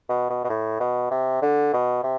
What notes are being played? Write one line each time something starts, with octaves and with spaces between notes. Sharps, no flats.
B2
B2
B2
A2
B2
C3
D3
B2
C3